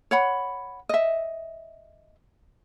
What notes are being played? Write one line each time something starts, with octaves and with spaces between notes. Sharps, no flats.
C#5 F#5 B5
D#5 E5